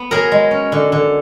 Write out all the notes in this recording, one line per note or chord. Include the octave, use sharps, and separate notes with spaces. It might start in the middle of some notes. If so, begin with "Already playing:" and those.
Already playing: B3
F#3 G#4 A#4
G#3
C#4
D3
D3